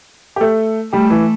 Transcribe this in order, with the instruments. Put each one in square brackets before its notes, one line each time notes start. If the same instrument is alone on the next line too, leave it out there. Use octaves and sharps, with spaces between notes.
[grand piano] G4
A3 A4
[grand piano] G3 G4 [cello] A3
[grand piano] E3